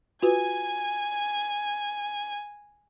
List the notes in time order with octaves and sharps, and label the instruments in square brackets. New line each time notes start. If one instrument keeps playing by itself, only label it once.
[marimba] F4 F#4 B4 [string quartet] G#5 G#6